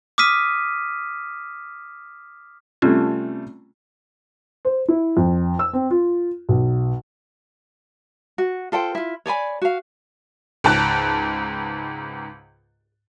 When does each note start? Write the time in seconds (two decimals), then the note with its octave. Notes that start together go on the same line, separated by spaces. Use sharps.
0.18 D6 D#6 F6 B6 D#7
2.82 C3 G3 A3 C4 C#4 F4
4.65 C5
4.88 E4
5.17 F2
5.59 E6
5.73 C4
5.91 F4
6.49 B1
8.38 F#4
8.72 F4 A4 C5 G5
8.95 E4 F4
9.26 C#5 D5 G#5 B5
9.62 F#4 F5
10.64 C#2 G#2 A5 F#6